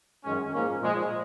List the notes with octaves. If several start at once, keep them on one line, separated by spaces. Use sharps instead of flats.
F#2 D#3 G#3 C#4
G#2 F3 A#3 C#4
A#2 F3 G#3